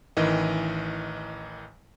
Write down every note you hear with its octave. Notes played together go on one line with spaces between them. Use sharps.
A1 D#3 E3 D#5